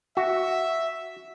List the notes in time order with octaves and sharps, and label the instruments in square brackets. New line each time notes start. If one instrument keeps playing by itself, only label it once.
[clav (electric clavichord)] F#4 [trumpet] E5